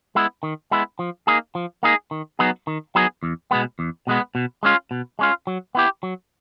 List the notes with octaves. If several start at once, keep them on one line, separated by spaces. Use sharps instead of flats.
G#3 B3 E4
D#3
G#3 B3 E4
F3
A#3 D#4 G#4
F3
A#3 D#4 G#4
D#3
F#3 B3 D#4 G#4
D#3
F#3 B3 D#4 G#4
E2
B2 G#3 B3
E2
B2 G#3 B3
B2
G#3 C#4 F4
B2
G#3 C#4 F4
F#3
B3 E4 G4
F#3